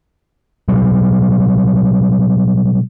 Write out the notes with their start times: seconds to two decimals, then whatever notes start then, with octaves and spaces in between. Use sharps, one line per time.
0.68 B2 F#3 G3